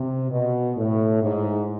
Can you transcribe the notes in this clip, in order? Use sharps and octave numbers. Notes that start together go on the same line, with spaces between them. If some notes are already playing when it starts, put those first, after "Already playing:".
Already playing: C3
B2
A2
G#2